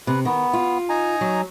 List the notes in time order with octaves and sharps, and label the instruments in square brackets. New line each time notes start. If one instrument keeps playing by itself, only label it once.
[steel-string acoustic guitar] C3 [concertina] B4
[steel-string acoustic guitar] D#3 [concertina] B3
[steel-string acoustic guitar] F4
[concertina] D#4 G#5 A#5
[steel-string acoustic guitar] F#3